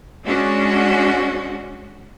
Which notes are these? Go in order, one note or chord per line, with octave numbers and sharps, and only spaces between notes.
G#3 C#4 D4 F#4